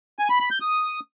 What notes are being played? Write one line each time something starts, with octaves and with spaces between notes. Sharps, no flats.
G#5
B5
B5
G6
D#6